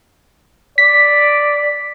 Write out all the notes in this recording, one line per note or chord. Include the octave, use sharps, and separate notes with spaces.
D5 B6